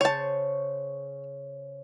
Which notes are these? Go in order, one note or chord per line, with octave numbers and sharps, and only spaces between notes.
C#3 C5 C#5 A5